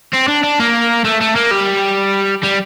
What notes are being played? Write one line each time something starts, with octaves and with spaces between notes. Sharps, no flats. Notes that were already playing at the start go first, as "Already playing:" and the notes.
C4
D4
D4
A#3
A3
A3
A#3
G3
G3